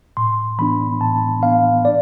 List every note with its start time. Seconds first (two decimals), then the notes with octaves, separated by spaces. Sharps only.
0.17 A2 C6
0.59 E3 B3 D4 B5
1.01 A2 A5
1.43 E3 B3 D4 F5
1.85 D5